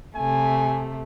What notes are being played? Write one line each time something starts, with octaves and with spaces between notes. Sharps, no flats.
C3 A3 G#5